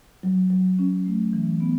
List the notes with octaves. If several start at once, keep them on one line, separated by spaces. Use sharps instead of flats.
F#3
F#3
C#4
A3
E3
B3